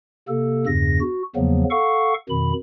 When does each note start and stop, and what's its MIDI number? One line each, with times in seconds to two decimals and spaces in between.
0.28 0.66 48
0.28 0.66 58
0.28 0.66 69
0.67 0.99 40
0.67 0.99 43
0.67 0.99 49
0.67 0.99 94
1.01 1.23 66
1.36 1.64 40
1.36 1.64 49
1.36 1.64 53
1.36 1.64 54
1.36 1.64 58
1.36 1.64 59
1.71 2.14 69
1.71 2.14 77
1.71 2.14 78
1.71 2.14 85
2.29 2.53 41
2.29 2.53 47
2.29 2.53 51
2.29 2.53 83